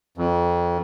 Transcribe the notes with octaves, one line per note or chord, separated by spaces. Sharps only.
F2